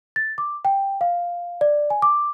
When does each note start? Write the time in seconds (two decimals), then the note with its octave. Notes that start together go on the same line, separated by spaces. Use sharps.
0.16 A6
0.38 D6
0.65 G5
1.01 F5
1.61 D5
1.90 G#5
2.02 D6